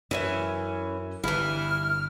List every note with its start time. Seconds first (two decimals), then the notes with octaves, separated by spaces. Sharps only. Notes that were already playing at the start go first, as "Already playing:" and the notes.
0.11 F#2 E3 C#4 E5
1.24 G1 G2 E3 E4 F6